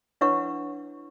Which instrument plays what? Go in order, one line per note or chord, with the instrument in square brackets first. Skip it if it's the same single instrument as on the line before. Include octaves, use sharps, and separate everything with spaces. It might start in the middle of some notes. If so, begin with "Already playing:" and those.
[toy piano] D4 E4 B4 C#5 F#5 C#6